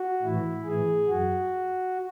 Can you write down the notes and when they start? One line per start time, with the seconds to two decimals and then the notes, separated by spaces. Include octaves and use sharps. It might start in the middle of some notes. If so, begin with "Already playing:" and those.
Already playing: F#4
0.23 A2 E3 E4
0.65 A2 E3 G#4
1.09 F#2 F#4